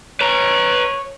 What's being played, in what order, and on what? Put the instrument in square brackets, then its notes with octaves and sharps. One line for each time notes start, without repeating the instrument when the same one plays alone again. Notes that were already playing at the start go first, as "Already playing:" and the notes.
[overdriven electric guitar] B4 A#5 [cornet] C#5